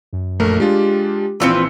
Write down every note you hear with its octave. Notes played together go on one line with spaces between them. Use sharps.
F#2
A#1 A3 A#4
G#3 D4 F4 G4
A#1 E3 C4 F4 B4 E6 C#7